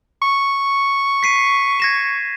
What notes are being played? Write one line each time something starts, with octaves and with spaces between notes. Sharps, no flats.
C#6
B6 C7 D#7
G#6 A#6 E7